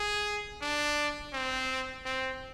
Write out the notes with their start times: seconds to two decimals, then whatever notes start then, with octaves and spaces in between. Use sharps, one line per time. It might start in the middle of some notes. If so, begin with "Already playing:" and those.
Already playing: G#4
0.61 D4
1.33 C4
2.05 C4